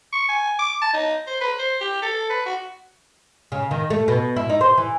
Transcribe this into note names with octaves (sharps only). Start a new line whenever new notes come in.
C#6
G#5
D6
A5
D#4
C5
B4
C5
G4
A4
B4
F#4
C#3
D#3
A3
B2
E4
D#4
C5
E3